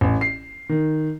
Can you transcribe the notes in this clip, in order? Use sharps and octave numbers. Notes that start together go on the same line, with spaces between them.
A1
C7
D#3